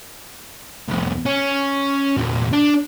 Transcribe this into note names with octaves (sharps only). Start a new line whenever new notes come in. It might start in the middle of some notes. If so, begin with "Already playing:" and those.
C2 F2
C#4
E2 A#2
D4